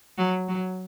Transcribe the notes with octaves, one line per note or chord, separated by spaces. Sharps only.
F#3
F#3